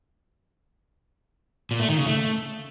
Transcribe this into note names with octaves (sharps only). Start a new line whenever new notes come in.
A#2
A3
D#3
C#3
A3